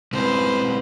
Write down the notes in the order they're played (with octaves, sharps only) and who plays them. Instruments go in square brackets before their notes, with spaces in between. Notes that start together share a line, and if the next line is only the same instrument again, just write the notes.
[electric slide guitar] C#3 G#3 C4 [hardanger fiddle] B4 C5